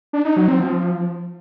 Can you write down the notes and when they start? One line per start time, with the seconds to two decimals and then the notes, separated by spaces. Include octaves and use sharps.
0.13 D4
0.25 D#4
0.37 F#3
0.48 C4
0.60 F3